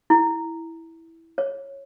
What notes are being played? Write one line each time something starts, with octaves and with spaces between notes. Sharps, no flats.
E4
C#5